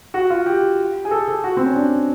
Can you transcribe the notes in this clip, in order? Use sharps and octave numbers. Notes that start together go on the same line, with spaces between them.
F#4
F4
G4
G#4
A4
A4
F#4
C4
C#4
D4